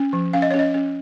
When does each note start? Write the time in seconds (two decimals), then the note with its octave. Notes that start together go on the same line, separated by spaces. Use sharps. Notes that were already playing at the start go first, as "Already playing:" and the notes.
Already playing: C#4
0.13 F3
0.33 C#4 F5
0.42 D#5
0.51 C#4 C#5
0.59 D#5
0.74 C#4